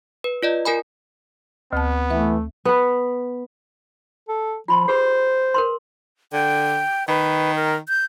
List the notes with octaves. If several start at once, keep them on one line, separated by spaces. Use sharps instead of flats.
B4
F4 D5 D#5
F4 A#4 G#5 B5
D2 B3 A5
E3 A3 E5
B3 B4
A4
F3 F4 B5 C6
G4 G#4 B4 C5
A#4 B4 C6
D3 G5
D#3 B4
A#4
G6